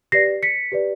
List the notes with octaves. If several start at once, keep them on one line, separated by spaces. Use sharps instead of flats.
G4 B4 D5 A#6 C7
B6 C#7
G4 B4 D5